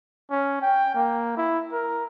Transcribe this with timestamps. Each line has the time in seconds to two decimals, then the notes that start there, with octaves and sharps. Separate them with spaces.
0.30 C#4
0.62 G5
0.96 A#3
1.37 E4
1.73 A#4